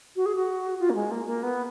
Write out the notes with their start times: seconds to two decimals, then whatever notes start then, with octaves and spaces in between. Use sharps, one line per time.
0.16 F#4
0.26 G#4
0.36 F#4
0.80 F4
0.90 A#3
0.95 G#3
1.11 A#3
1.26 A#3
1.43 B3